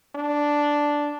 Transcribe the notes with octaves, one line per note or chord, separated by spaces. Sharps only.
D4